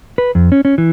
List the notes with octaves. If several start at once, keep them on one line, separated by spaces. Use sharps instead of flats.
B4
F2
C#4
C#4
E3